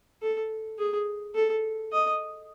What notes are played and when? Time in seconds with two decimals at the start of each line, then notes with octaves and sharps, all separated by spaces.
0.22 A4
0.79 G#4
1.35 A4
1.92 D#5